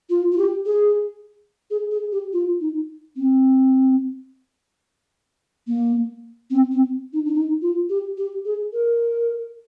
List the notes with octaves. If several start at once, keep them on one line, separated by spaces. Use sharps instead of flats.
F4
F4
G4
G#4
G#4
G#4
G4
F4
D#4
C4
A#3
C4
C4
D#4
D4
D#4
F4
G4
G4
G#4
A#4